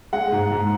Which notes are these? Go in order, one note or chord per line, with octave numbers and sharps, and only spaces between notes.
G#3 F#5
G#2
G#2